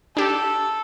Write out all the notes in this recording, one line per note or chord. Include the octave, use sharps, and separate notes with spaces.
D4 G4 A4